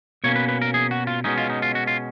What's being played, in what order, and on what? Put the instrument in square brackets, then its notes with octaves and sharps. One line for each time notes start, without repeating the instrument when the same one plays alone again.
[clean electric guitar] B2 A#3 C#4 C#5
B4
B4
A#4
G#4
F#4
F4
B2 G#3 C#4 D#4
F4
D#4
F4
F#4
F4